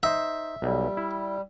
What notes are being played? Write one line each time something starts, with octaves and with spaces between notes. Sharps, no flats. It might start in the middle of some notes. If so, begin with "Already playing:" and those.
D#4 C5 E5
B1 G3
E4